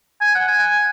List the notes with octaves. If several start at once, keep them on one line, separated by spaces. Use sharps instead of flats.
G#5
F#5
G#5